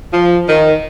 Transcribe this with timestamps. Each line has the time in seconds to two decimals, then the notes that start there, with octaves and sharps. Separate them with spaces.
0.13 F3
0.48 D#3